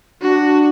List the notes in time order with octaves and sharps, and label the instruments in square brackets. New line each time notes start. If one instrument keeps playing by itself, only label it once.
[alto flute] D4 [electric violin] F#4